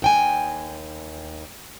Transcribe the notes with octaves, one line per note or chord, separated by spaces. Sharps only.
D#2 G5 G#5